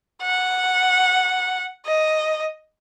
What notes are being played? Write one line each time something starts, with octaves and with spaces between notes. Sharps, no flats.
F#5
D#5